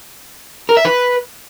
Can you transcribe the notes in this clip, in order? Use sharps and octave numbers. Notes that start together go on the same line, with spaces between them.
A#4
E5
B4